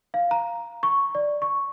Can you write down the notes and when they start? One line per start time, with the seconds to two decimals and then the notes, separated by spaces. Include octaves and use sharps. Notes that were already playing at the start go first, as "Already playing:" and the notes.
0.14 F5
0.31 A#5
0.83 C#6
1.15 D5
1.42 C#6